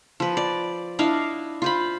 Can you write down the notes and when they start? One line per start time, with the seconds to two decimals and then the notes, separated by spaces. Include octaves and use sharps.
0.20 F3 B4
0.37 D5
0.99 D4 E4 D#5 F5
1.62 F4 C5 B5